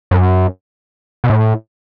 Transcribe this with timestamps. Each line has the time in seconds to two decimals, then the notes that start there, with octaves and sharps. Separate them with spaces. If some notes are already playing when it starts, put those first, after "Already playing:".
0.11 F#2
1.24 B2
1.30 A2